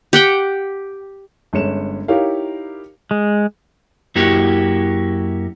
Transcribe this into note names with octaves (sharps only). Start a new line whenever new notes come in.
G4 F#5 G5
G1 G#3 C#4 C#7 E7
D#4 E4 G4 A#4 C#5 F5
G#3
F#2 A#3 E4 F#4 G4